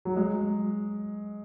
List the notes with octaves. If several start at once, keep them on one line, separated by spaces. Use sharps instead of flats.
F#3
G#3